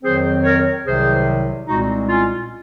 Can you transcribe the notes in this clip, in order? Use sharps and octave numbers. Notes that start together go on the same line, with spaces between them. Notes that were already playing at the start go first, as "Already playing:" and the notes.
F2 D#3 F#3 C4 G#4 C5
A#4 C#5
C2 C3 D#3 F#3 G#4 C5
C2 A#2 G#3 C4 D#4 F#4
C#4 F4